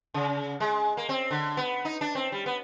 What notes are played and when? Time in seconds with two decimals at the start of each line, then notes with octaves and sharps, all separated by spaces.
0.14 C#3
0.60 G#3
0.97 A#3
1.09 C4
1.31 D3
1.57 B3
1.85 D#4
2.01 D4
2.15 C4
2.32 G3
2.46 B3